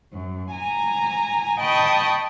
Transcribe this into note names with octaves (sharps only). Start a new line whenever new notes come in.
F#2
G#5 A#5
D#5 G5 A5 B5 C#6 D#6